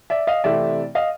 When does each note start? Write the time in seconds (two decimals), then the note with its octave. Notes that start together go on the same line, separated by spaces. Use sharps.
0.10 D5 E5
0.27 D#5 F5
0.44 C3 E3 A3 C4 D5 E5
0.95 D#5 F5